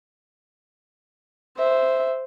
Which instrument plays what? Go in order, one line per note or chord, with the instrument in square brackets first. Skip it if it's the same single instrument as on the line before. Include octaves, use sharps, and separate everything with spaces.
[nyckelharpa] C5 [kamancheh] E5